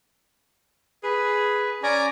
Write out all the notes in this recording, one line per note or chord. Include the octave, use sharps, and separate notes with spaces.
G#4 B4
C#4 D5 G#5 A#5